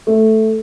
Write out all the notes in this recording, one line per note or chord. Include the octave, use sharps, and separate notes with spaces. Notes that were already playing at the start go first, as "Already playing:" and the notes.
A3